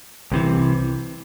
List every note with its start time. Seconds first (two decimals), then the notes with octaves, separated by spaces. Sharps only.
0.32 C2 C3 E3